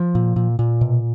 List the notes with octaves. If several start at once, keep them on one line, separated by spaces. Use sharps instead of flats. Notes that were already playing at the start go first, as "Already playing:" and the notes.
Already playing: F3
A#2
A#2
A#2
B2